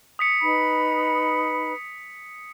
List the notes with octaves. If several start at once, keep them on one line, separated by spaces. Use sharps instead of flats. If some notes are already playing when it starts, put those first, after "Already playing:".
D#6 B6 C#7
D#4 B4 B5